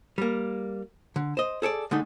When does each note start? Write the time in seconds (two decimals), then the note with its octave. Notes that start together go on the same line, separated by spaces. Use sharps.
0.18 G3 A#3
1.16 D3
1.37 C5 D#5
1.62 G#4 A4 C#5 D5
1.91 D3 G#3 A3 D#4